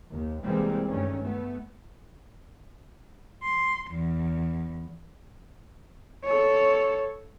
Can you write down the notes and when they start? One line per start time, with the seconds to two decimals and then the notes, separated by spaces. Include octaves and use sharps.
0.12 D#2
0.44 C2 E3 G3 G#3 A#3 C4
0.89 G2 D#3 A3 C#4
1.23 A3 B3
3.45 C6
3.91 E2
6.25 A4 C#5